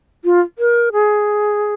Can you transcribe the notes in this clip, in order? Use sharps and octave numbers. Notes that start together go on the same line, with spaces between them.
F4
A#4
G#4